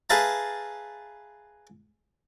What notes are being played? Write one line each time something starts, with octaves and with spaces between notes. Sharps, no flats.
G#4 B4 E5 F5 A5 A#5